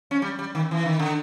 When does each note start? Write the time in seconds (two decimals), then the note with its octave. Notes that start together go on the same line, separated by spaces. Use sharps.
0.11 C#4
0.22 G3
0.39 G3
0.55 D#3
0.71 E3
0.86 D#3
0.99 D3